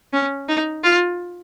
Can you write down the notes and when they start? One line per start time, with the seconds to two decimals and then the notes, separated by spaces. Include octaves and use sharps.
0.13 C#4
0.48 D#4
0.84 F4